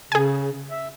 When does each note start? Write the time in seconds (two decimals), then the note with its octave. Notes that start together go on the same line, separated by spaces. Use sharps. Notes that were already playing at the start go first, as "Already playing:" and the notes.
0.12 C#3 G#4 G#5
0.71 E5